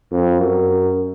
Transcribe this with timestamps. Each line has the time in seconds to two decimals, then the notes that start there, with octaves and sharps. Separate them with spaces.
0.11 F2
0.40 F#2